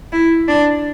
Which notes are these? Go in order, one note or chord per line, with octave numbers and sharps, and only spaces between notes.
E4
D4